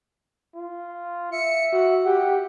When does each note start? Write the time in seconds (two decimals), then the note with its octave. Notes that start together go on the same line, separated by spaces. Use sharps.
0.55 F4
1.32 E5 C#7
1.73 F#4
2.05 G4 F#5